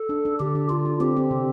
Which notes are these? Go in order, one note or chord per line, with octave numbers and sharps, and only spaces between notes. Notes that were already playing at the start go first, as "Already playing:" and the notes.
Already playing: A4
D4
D4
D3 G4
D3
D3 F4
D4
C4 G4
C4
C3